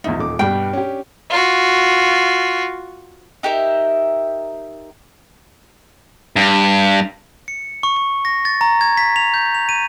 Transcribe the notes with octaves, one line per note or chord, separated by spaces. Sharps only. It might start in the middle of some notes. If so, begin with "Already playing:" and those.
A#1 E2 D#4 E5
D#1 A#2 D6
G2 B2 G3 D4 G5
C#4 G4
F4 F#4
D#4 G4 A#4 E5
G2
C#7
C#6
C#6
A#6
A6
A#5
G#6
B6
F7
G6
F7
D#7